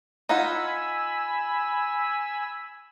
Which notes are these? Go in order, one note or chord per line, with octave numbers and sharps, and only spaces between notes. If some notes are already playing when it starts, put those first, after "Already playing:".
D#4 F4 F#5 G#5 B5 E6